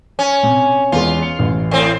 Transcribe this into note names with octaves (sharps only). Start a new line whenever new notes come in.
C#4
C3
E2 G#3 F4
C#7
A1
A2 C4